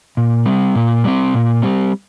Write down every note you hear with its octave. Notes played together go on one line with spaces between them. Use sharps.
A#2
G3 C4
A#2
G3 C4
A#2
G3 C4